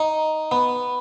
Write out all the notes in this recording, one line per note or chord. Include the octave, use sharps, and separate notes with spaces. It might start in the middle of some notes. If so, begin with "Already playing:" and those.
Already playing: D#4
B3